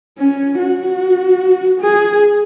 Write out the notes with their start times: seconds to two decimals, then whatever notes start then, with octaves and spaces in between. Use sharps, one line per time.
0.18 C#4
0.59 F#4
1.80 G#4